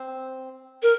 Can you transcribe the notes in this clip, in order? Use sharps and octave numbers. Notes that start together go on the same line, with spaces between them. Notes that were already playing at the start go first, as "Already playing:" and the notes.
Already playing: C4
A#4